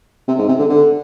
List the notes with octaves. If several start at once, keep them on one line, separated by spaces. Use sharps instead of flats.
C3
G#2
C3
D3
D3